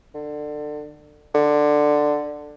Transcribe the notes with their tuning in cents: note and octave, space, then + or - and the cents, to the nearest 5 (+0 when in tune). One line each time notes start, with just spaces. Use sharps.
D3 +25
D3 +10